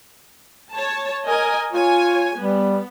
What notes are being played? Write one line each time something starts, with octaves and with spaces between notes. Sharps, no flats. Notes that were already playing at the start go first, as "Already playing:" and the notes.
C#5 A5
A#4 D#5 G#5
F4 C#5 G#5
G3 B3